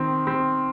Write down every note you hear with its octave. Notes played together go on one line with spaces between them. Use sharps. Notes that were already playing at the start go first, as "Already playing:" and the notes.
Already playing: D#3 C4
C4